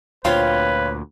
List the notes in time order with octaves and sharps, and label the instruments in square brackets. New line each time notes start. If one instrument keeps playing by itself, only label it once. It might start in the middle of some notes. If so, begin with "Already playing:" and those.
[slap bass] D2 A#2 [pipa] C4 F4 [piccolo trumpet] B4 [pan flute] C#5